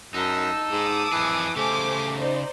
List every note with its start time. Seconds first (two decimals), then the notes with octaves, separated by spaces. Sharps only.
0.14 F#2 D#4 A5 E6
0.72 G#2 D6 D#6
1.12 F2 E3 G#4
1.56 C#3 A3 G4 C5 G#5 D6
2.14 D#4 C5 D5